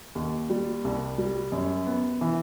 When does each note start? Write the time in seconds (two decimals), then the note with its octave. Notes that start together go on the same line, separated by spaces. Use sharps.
0.15 D#2
0.50 G3
0.84 C2
1.18 G3
1.52 F#2
1.86 B3
2.21 E3